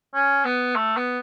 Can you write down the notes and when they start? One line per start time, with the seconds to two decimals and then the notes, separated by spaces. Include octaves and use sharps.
0.15 C#4
0.45 B3
0.76 A3
0.97 B3